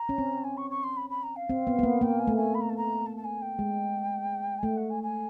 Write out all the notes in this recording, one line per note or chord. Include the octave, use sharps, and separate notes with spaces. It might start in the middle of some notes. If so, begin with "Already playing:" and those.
Already playing: A#5
C#4
C4
G#5
C#6
C#6
C6
B5
B5
A#5
F5
C4
B3
B3
A#3
A#3 G5
G#5
A3
G#5
B5
A#5
A5
A#5
A5
A5
G#5
G5
G#3
G#5
A3 G5
F#5
G#5
G#5